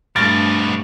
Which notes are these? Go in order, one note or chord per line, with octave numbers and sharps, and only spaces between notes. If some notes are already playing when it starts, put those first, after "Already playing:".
G2 B2 G3 A3 F6 A6 A#6 D7